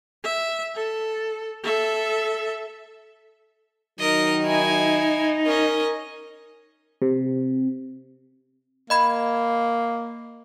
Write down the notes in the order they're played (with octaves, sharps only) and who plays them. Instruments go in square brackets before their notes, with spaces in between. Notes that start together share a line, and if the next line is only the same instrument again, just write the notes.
[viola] E5
A4
A4 E5
[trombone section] D#3 F#3 [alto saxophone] D#4 [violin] A#4 D#5
[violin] E4 G#5
[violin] C#4 D#5 [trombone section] A#4
[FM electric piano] C3
[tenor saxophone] A#3 [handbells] D#5 B5 G#6